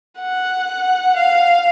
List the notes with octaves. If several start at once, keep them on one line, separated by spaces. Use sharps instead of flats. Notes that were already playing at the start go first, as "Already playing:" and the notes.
F#5
F5